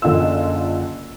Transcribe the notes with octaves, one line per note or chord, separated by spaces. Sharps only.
F#1 D3 F4 D#5 E6